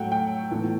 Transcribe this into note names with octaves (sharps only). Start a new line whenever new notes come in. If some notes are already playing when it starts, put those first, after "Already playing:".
Already playing: A2 F#3 A3 F#5 G5
G5
A2 E3 B3